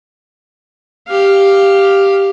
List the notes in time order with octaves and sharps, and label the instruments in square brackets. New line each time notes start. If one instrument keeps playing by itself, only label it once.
[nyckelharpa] G4 F5